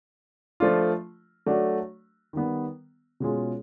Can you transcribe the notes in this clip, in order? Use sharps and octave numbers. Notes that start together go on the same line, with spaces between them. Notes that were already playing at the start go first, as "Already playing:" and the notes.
F3 A3 D4 F4
F#3 A3 D4 F#4
D#3 G3 B3
B2 G#3 C#4 F4 G#4